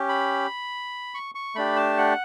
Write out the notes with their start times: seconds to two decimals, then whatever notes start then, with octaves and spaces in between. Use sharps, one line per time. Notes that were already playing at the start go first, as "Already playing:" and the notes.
Already playing: C#4 G4
0.09 B5
1.14 C#6
1.35 C#6
1.55 A3 D4 G4 B5
1.76 A5
1.98 F#5